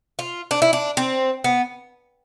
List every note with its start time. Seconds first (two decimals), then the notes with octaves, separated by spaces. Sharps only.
0.19 F4
0.51 D4
0.62 E4
0.73 D4
0.97 C4
1.44 B3